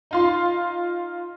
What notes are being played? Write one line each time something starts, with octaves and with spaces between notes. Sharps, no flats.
D#4 F4 C6